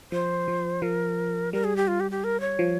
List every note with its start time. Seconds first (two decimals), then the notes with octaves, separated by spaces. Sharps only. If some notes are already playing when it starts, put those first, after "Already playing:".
0.12 F3 C5
0.48 F3
0.82 F3 A#4
1.53 G3 A#4
1.64 G#4
1.76 G4
1.88 F4
2.00 G4
2.11 G4
2.24 A#4
2.41 C#5
2.59 F3